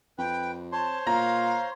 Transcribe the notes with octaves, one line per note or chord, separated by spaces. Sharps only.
F2 B4 G5
C5 C#5 A5 C6
A#2 F5 A#5